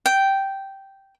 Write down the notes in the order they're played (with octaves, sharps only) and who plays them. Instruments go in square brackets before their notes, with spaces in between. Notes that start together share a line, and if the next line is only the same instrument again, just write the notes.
[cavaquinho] G5